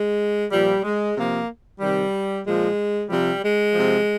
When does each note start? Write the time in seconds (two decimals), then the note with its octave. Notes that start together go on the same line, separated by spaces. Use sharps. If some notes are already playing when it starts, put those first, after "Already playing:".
Already playing: G#3
0.51 A#2 F3 G3
0.84 G#3
1.16 C3 F3 A#3
1.80 C3 D#3 G3
2.45 A#2 F3 G#3
3.09 C3 F3 G3
3.42 G#3
3.74 C3 F3